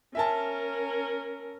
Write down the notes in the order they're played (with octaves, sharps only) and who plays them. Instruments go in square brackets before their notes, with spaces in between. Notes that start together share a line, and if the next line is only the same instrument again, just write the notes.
[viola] C#4 A#4 [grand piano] E5 G#5 A5